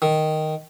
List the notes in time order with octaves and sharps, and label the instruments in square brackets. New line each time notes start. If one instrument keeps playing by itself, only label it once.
[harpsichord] D#3